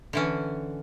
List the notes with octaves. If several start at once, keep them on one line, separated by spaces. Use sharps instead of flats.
D3 E3 C#4